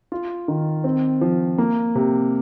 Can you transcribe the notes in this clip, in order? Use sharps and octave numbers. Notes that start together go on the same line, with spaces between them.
F4
D#3
C4
F3
A#3
C3